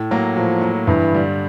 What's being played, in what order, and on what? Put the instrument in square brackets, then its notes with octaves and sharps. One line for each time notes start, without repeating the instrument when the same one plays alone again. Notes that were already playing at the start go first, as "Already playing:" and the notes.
Already playing: [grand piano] A2
F#3 A#3
[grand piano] A2 [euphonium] F3
[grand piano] F#3 A#3
[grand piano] G2 [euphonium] E3
[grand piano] D3 G3